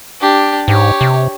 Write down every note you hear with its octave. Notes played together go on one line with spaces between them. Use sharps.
D4 G4
G#2 G4 C#5
C3